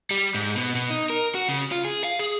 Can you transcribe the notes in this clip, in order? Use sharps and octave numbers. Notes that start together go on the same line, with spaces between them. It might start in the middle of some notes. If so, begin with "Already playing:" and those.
G3
G#2
B2
B2
D#4
A#4
F#4
C#3
F4
G#4
F5
G#4